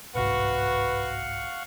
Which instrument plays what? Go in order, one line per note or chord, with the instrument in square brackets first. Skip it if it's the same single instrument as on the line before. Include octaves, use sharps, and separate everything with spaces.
[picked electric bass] G1 C2 G#2 [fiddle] F#4 [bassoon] B4 [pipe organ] F5 F#5 C#6